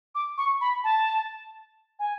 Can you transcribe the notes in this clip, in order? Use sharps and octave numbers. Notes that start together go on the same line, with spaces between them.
D6
C#6
B5
A5
G#5